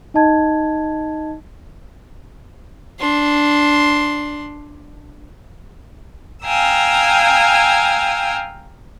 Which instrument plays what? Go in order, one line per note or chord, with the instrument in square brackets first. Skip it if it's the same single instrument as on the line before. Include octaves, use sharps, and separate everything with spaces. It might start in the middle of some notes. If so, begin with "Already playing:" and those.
[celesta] D#4 D#5 A5 G#6
[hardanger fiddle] D4 C6
[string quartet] F5 G5 G#5 A#5 D#6 E6